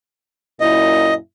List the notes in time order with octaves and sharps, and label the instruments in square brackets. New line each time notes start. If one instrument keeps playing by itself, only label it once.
[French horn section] F#2 A#2 E4 [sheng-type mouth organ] D#5